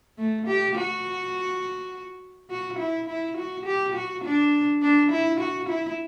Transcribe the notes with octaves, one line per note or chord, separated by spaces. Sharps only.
A3
G4
F#4
F#4
E4
E4
F#4
G4
F#4
D4
D4
E4
F#4
E4